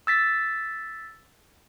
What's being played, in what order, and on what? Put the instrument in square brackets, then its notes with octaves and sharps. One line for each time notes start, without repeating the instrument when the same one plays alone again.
[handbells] E6 A6 B6